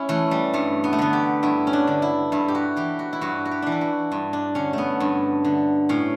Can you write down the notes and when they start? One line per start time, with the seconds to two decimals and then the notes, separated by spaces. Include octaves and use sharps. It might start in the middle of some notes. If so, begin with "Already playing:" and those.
Already playing: C#4 E4
0.09 E3 A3
0.31 G3
0.54 G2 A3
0.84 B3
0.93 A3
0.99 D3 B3
1.13 G4
1.43 G2 E4
1.67 C#4
1.73 D4
1.87 D3
2.02 E4
2.32 G2 E4
2.48 G4
2.55 F#4
2.77 E3 G4
2.99 F#4
3.13 E4
3.21 G2 F#4
3.45 F#4
3.51 G4
3.62 E3 D4
3.72 E4
3.81 F#4
4.12 G2
4.33 D4
4.55 D3 C#4
4.73 A3 B3
5.00 G2
5.45 D3
5.89 A2 C#4